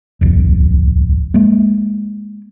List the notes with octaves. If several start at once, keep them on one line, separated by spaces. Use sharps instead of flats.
D1 C2 F2
G#3 A#3